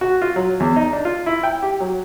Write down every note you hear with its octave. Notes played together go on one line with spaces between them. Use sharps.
F#4
F4
F#3
E2
D#4
D4
F4
E4
G5
G4
F#3